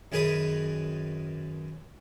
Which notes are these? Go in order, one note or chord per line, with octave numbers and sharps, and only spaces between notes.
F#2 D#3 G#4 B4 D#6